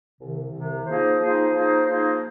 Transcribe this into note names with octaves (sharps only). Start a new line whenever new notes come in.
C2 C3 D#3
C2 C3 D#3
F3 A#3 D#4 G#4 C5
F3 A#3 D#4 G#4 C5
F3 A#3 D#4 G#4 C5
F3 A#3 D#4 G#4 C5